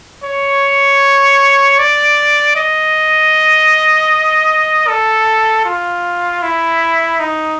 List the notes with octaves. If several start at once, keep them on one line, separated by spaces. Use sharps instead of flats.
C#5
D5
D#5
A4
F4
E4
D#4